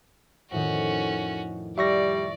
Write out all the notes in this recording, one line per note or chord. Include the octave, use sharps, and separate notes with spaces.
F2 A2 D#3 C#4 F#4
G3 D5 E5 C#6 A#6